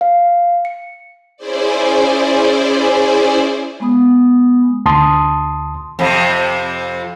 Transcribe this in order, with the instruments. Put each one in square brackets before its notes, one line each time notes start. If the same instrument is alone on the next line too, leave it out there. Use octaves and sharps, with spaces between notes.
[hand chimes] F5
C#7
[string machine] C#4 E4 G#4 C5 D5
[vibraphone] G#3 B3 B5 D#6
[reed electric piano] D2 A5 C6 D#6
[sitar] F2 C3